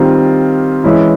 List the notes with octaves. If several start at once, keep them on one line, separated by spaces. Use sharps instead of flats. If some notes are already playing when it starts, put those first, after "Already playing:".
Already playing: D#3 G3 C4 F4
E3 G#3 C#4 E4